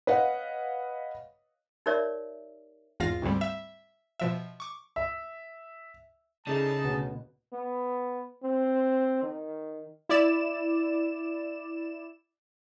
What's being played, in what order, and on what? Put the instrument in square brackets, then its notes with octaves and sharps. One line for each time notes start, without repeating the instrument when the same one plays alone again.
[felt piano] B4 C#5 D#5 F5 F#5
[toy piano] D#4 G4 A#4 C#5 D5 E5
[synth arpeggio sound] G#1 E2 G#2 F4 F5 A#6
D2 G#2 D3 G3 C4
E5
B2 F3 E5
C#6 D6
[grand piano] E5
[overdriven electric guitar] C#3 [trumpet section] D#4 A5 [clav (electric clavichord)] E4 A4 D5 [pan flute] G#4
[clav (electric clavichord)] D2 B2 B3
[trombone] B3
C4
D#3
[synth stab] E4 D5 E7